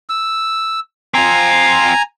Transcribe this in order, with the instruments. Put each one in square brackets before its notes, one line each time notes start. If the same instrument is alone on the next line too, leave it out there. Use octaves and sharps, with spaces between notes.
[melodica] E6
[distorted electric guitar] C4 F4 [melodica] G#5 A#5